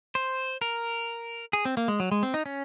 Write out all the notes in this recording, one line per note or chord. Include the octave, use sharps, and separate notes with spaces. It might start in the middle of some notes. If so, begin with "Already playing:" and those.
C5
A#4
G#4
C4
A#3
G#3
F#3
G#3
C4
D#4
C#4